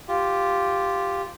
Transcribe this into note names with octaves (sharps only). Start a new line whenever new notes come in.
F4 G4